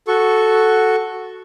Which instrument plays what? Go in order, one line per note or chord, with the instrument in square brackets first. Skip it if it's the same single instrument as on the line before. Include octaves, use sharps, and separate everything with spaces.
[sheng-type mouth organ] F#4 A4 C#6